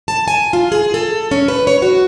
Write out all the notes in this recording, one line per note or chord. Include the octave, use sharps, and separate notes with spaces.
A5
G#5
F4
G#4
A4
C#4
B4
C#5
F#4